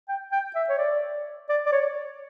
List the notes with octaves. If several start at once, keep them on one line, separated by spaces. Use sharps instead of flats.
G5
G5
E5
C#5
D5
D5
D5
C#5